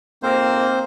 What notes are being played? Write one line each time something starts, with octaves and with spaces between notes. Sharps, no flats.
F2 G#2 A#3 C4 C5